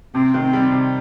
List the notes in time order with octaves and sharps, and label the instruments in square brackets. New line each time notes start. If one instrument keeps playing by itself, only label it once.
[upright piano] C3 [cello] C4
[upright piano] D#3
[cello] C4
[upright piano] G3
C3